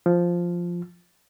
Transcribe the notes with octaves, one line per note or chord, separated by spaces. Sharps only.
F3